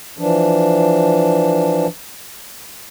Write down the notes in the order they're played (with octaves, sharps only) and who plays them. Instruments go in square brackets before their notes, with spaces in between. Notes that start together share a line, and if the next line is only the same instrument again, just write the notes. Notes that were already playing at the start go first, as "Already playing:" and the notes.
[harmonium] E3 F3 D4